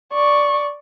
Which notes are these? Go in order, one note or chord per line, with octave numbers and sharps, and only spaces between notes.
D5 C#6